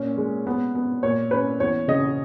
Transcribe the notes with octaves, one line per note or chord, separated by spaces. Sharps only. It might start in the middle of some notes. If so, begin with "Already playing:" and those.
Already playing: A#2 C#4
G#3
B3
B3
A#2 C#5
C#4 B4
E2 C#5
C#3 D#5